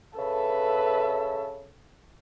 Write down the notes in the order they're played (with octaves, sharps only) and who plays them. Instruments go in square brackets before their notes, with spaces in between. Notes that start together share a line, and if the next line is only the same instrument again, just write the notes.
[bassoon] C#3 [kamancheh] A4 E5 [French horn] B4